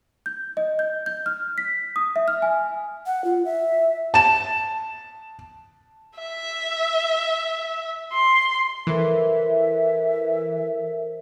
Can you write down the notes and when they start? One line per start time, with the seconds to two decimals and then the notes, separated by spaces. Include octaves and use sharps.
0.26 G6
0.57 D#5
0.79 G6
1.06 G6
1.26 F6
1.58 B6
1.96 D#6
2.16 E5
2.28 F6
2.42 G#5
3.06 F#5
3.24 F4
3.45 E5
4.14 A5 E7
6.19 E5
8.13 C6
8.87 E3 A4 A#4 C5 E5